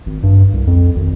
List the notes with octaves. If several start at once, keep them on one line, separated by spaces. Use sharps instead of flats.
G#1
G2
C2
F2
G#1